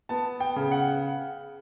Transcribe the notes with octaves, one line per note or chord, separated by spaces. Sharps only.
B3 A5
G5
C#3
F#5